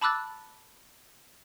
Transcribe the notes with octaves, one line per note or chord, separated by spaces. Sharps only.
A5 B5 D6 E6 F#6 A6